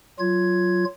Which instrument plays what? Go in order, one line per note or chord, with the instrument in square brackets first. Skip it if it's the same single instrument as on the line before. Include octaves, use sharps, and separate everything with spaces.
[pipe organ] F#3 F4 G#6